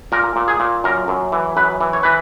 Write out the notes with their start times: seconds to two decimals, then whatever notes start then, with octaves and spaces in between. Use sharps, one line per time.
0.12 A#2 A#4
0.36 A#2
0.48 G#4
0.60 A#2
0.84 F#2 A#4
1.08 F#2
1.32 E3
1.57 F#2 B4
1.81 E3
1.93 C#5
2.03 E3 B4